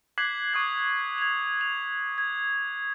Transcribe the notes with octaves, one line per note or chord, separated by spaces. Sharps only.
D6 F#6 G#6 B6 C7 F#7
C#6 D#6 G#6
G#6 F7
F7
G#6